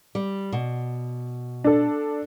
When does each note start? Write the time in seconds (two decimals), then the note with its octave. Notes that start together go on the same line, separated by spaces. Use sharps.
0.15 G3
0.52 B2
1.64 D4 A4